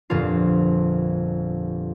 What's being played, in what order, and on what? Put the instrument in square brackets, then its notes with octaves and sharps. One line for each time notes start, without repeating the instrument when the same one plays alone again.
[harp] G1 F2 A#2 F3 F4 C7